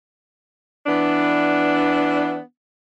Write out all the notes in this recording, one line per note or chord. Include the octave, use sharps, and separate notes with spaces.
E3 B3 D4